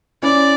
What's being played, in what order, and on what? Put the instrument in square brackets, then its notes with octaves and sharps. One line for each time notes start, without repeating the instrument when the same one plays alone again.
[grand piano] C#4 E4 [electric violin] D5